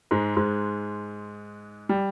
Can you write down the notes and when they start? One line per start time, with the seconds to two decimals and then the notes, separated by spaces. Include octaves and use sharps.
0.11 G#2 G#3
0.37 G#2 G#3
1.89 G3